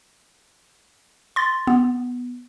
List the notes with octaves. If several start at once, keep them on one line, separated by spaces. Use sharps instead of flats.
C6 A6
B3